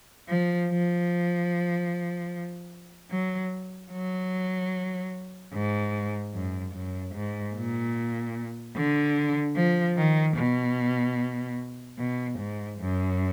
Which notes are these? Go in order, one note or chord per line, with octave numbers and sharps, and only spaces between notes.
F3
F3
F#3
F#3
G#2
F#2
F#2
G#2
A#2
D3
F3
D#3
B2
B2
G#2
F#2